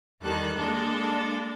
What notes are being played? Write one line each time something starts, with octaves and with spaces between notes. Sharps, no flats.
E2 D#3 G3 A4 F#6
G#3 A#3 D4 A4